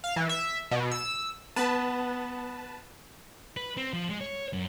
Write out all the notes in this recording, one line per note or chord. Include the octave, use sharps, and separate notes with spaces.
F5
E3
E5
B2
E6
B3 B4 A5
B4
C4
F3
G#3
C#5
F#2